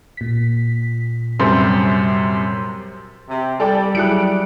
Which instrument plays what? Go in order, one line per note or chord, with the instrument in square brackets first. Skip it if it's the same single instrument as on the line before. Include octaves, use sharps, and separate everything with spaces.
[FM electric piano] A#2 B6
[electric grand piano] F#2 C3 G3 [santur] C5
[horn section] C3
[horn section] G3 [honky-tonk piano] A4 D5 G5
[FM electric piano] F#3 E4 G#4 [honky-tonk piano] F#6 C#7 D7